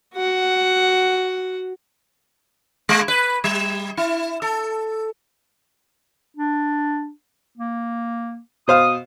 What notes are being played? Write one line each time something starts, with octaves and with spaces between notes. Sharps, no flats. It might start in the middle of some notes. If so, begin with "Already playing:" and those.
F#4 F#5
G#3
B4
G3
E4
A4
D4
A#3
B2 C5 F5 D#6